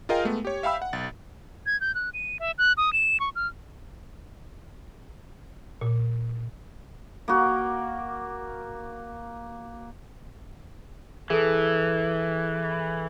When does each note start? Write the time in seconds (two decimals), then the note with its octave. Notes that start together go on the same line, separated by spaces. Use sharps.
0.09 F4 G#4 A#4 D#5 F5 G5
0.25 G#3 A3 B3
0.45 G4 C#5
0.63 E5 F5 G5 B5 E6
0.82 F#5
0.93 B1 A6
1.66 G#6
1.81 G6
1.95 F#6
2.14 D#7
2.40 E5
2.58 F#6
2.77 D#6
2.93 E7
3.20 C#6
3.36 F6
5.81 A#2
7.28 A#3 F#4
11.30 E3 G#4 A4